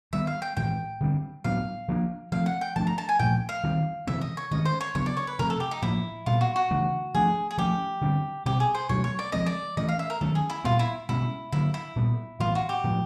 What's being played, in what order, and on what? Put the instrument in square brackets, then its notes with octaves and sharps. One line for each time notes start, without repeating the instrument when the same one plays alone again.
[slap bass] D#3 G3 B3 [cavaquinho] E5
[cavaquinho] F5
G5
[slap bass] A2 E3 G#3 [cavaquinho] G5
[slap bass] D3 G3 C4
[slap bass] A2 F#3 B3 D4 [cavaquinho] F5
[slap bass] F3 A#3 D4
[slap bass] F3 A3 C4 [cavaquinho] F5
[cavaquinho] F#5
G5
[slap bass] F3 A3 D4 [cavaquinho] A5
[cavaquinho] A#5
A5
G#5
[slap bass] A#2 F3 A3 [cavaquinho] G5
[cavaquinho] F5
[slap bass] D#3 G3 C4
[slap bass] C3 E3 G#3 C4 [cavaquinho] E5
[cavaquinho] D#5
C#5
[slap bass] D#3 G#3 C#4 [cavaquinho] D#5
[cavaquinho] C5
C#5
[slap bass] C#3 F#3 B3 D4 [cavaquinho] C#5
[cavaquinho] D5
C#5
B4
[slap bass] C3 F3 A3 C4 [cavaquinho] A#4
[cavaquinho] A4
G4
D#4
[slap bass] A2 F3 A#3 [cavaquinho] E4
[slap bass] A#2 G3 B3 [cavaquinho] F4
[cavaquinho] F#4
F#4
[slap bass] C#3 E3 A3 D4
[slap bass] F3 A3 D4 [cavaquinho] G#4
[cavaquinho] G#4
[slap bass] F3 A3 C#4 [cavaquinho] G4
[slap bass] D3 G3 C4
[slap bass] B2 G3 C4 [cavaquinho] G4
[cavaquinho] G#4
C5
[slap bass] B2 F#3 A3 D4 [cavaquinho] C#5
[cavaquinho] C#5
D5
[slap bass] F3 G#3 C4 [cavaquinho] D#5
[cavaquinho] D5
[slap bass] E3 A3 C#4 [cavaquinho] D#5
[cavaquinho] F5
E5
A#4
[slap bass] D#3 F#3 A3 C#4 [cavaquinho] A4
[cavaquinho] G#4
E4
[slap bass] A#2 G3 B3 [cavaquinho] F4
[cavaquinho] E4
[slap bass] B2 G#3 C#4 [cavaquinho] E4
[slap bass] D3 F#3 A#3 [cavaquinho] E4
[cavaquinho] E4
[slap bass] A#2 G3 B3
[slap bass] A2 E3 G3 B3 [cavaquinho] F4
[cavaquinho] F#4
G4
[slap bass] A2 F3 G#3